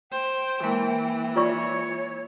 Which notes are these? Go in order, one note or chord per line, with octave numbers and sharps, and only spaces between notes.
C5 G5
E3 G#3 A#3 A#4
F4 C#5 D5 C#6